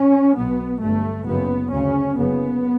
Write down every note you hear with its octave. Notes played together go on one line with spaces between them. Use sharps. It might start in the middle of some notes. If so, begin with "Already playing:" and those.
Already playing: C#4
B1 B2 B3
G1 G2 A3
F#1 F#2 C#3 B3
D2 C#3 C#4
F#1 F#2 C#3 B3